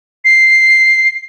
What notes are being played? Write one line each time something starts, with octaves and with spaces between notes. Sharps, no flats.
C7